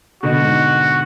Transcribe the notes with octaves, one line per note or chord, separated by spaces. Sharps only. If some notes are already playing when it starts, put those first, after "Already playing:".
B2 D3 F#4
G#2